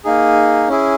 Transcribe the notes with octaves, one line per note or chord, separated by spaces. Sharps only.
A#3 D#4 G#4
C#4 E4 G#4